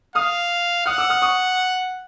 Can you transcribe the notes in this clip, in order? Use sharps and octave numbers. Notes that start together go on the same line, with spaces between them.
F5 D#6 F6
F#5 D#6 F6
D6 E6
D#6 F6
C#6 D#6